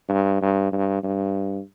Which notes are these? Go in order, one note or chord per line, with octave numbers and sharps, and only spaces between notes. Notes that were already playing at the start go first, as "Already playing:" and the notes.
G2
G2
G2
G2